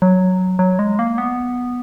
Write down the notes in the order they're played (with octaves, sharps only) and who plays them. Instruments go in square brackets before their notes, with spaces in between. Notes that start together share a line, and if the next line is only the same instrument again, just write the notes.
[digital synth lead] F#3
F#3
G#3
A#3
B3